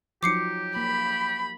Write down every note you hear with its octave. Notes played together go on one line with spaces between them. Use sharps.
F3 F#3 D#4 G4 D6 C7 C#7
A#3 B5